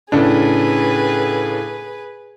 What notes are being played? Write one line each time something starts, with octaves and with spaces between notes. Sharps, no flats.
A2 C#3 D4 G#4 B4